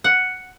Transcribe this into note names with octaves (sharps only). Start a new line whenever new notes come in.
F#5